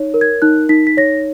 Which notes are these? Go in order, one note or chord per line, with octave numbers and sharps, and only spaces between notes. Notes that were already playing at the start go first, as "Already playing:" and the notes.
Already playing: D#4 C#5
A#4
G#6
D#4 F#6
D#4 B6
B6
C#5 A#6